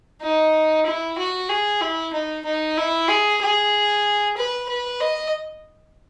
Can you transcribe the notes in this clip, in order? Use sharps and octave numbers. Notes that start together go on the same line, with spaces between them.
D#4
E4
F#4
G#4
E4
D#4
D#4
E4
G#4
G#4
B4
B4
D#5